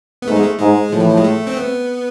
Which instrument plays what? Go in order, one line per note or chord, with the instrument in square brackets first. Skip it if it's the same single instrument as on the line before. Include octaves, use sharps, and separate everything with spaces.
[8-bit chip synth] B3
[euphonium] G#2 [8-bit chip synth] A3
[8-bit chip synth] G#3
A3
[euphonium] G#2 [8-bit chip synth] G#3
[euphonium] A2 [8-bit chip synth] F3
[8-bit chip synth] E3
F3
G#3
A3
C4
B3